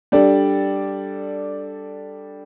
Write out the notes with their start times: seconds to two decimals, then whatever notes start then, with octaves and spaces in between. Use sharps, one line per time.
0.12 G3 D4 A4 D5